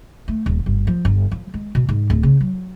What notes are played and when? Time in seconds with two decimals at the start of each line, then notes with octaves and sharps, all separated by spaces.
0.28 A3
0.46 D#1
0.66 G1
0.87 F3
1.05 G1
1.31 F3
1.54 G#3
1.75 B2
1.89 G#2
2.10 D1
2.23 C#3
2.41 F#3